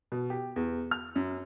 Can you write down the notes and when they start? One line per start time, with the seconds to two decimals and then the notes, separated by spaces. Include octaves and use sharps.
0.12 B2
0.30 G4
0.56 E2
0.91 F6
1.16 F#2